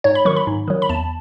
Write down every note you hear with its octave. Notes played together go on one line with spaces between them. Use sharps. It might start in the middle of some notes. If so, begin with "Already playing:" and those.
G#2 C#5
B5
D#3 F#3 C#6
B5
G#2
D#3 F#3
B5
E2 A5